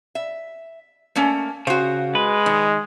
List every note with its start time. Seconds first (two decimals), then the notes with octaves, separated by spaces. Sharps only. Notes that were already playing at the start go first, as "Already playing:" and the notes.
0.15 E5
1.16 A3 A#3 C#4
1.67 C#3 F#4 C5
2.15 G#3 B4
2.46 D#3